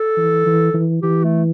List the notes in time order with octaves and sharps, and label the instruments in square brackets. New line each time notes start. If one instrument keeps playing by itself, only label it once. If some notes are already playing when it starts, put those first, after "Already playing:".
Already playing: [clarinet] A4
[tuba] E3
E3
E3
[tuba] E3 [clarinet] G4
[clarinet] A3